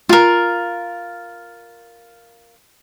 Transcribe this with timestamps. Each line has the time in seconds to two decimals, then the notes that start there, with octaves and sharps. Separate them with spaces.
0.09 F4 A#4